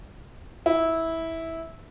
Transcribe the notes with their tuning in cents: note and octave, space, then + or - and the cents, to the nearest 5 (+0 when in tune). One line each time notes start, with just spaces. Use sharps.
E4 -15